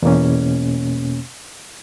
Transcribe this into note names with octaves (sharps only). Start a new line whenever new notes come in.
E2 B2 A#3 C#4